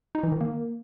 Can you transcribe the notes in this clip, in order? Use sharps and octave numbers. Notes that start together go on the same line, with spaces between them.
D#4
E3
D#3
A#3